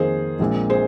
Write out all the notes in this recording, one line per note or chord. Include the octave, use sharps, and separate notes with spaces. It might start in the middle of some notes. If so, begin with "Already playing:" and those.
Already playing: F2 D#3 A#3 G#4 C5
A#1 A#2 G#3 C4
G#4 C5